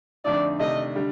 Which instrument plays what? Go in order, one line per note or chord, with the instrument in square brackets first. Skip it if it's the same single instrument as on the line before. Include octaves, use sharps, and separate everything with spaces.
[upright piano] F2 D3 A3 D#4 [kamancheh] D5
[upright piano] C3 D#3 A3 D4 [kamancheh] D#5
[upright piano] D3 G3